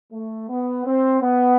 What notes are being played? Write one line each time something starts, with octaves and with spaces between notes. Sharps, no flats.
A3
B3
C4
B3